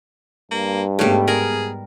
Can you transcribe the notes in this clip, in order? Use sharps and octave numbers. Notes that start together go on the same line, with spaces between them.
G2 A#3
G#2 C#3 G3 A3 B3
G#4 A#4